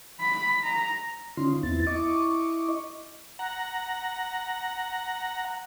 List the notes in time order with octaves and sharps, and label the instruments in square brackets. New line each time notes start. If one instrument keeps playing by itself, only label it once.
[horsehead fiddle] B5
A#5
[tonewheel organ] D3 C#4 D#4 F4 C6
E2 B3 C4 E4 A6
E4 D#5 C#6 D6
F#5 A#5